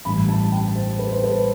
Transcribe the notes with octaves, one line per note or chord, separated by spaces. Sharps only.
A1 G2 E3 G3 B5
A5
G5
C5
B4
C5
B4